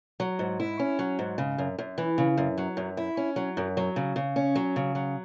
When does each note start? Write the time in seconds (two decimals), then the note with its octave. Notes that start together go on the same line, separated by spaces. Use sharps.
0.20 F#3
0.39 G#2
0.60 E4
0.79 C#4
0.99 F#3
1.19 G#2
1.38 C#3
1.58 F#2
1.79 F#2
1.98 E3
2.18 C#3
2.38 F#2
2.58 F#3
2.77 F#2
2.97 E4
3.17 C#4
3.36 F#3
3.57 F#2
3.77 F#3
3.96 C#3
4.16 C#3
4.36 C#4
4.55 F#3
4.76 C#3
4.95 F#3